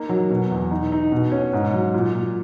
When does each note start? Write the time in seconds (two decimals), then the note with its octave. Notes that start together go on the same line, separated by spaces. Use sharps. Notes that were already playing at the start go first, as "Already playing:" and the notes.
Already playing: A#3 D#4
0.09 F#3
0.30 B2
0.51 E2
0.71 D#4
0.92 D#4
1.12 B2
1.32 C#4
1.53 G#2
1.74 F#3
1.94 A#2
2.14 A#2